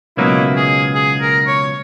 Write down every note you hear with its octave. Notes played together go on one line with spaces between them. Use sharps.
C#2 B2 F#3 A#3 D#4 E4
G#4
G#4
A#4
C#5